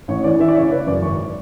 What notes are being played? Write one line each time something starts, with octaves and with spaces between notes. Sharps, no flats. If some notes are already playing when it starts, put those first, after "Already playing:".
A1 C#5
E3 D5
E3 E5
D5
C#3 C#5
C#3 B4
F#2 D5
G#1 C#6